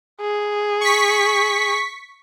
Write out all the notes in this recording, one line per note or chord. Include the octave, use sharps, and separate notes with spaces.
G#4
C#6 B6